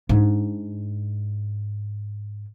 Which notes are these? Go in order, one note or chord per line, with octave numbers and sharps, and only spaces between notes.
G#2 D4